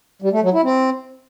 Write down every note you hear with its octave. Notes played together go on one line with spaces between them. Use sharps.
G3
A3
F#3
E4
C4